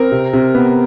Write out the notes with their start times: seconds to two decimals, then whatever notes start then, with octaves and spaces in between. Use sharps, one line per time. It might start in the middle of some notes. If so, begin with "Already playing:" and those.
Already playing: C4 A#4
0.12 C3
0.33 C3
0.55 B3